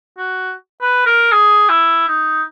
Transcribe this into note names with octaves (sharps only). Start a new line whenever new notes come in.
F#4
B4
A#4
G#4
E4
D#4